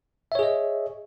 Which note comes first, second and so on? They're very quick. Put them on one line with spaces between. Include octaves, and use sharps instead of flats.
E5 C#5 G#4 D#5